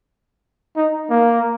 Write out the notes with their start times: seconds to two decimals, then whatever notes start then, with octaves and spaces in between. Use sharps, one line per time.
0.76 D#4
1.10 A#3